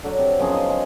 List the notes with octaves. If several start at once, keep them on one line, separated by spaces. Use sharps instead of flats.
D3 F#3
C3
F#2 B2 F3 G#4
D#4 C5 D#5
G#4